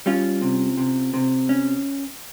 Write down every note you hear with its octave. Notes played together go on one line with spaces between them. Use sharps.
G3 C#4 F4
C3
C3
C3
C#4